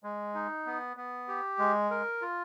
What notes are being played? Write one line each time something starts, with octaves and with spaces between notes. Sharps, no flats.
G#3
D#4
B3
B3
G4
G#3
A#4
F4